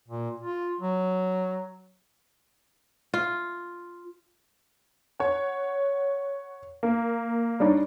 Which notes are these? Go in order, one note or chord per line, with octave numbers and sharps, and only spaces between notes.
A#2
F4
F#3
F4
C#5 F#5
A#3
G3 D4 D#4 C#5